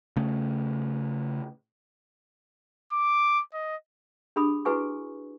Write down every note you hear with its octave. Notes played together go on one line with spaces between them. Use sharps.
C#3 A3
D6
D#5
D4 G4 G#4 B5 D#6
E4 F#4 G#4 B4 G#5 C#6